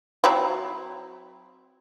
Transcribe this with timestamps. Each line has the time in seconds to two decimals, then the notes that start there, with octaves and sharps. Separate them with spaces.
0.24 F#3 C4 E4